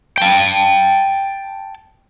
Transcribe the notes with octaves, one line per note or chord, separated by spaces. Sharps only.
G5 A5